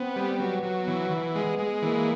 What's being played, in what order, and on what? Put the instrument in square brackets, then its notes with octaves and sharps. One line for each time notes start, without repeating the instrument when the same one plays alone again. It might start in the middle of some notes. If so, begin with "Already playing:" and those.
Already playing: [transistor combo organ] B3 [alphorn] C4
[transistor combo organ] G3
[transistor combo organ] F#3 [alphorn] B3
[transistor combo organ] F#3
[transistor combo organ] E3 [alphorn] B3
[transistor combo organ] E3
G#3
G#3
[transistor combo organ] E3 [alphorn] A#3